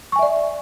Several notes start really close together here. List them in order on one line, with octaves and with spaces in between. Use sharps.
C#6 G#5 E5 D5